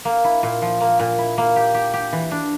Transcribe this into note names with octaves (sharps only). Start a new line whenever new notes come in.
A#3
E4
A#2
F3
A#3
A#2
E4
A#3
G4
G4
G4
E3
D4